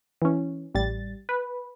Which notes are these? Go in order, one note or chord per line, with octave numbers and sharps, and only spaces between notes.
E3 C#4
A1 G3 A6
B4